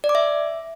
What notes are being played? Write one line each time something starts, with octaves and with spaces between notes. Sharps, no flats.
D5
D6
E5